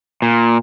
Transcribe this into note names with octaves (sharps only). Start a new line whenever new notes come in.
A#2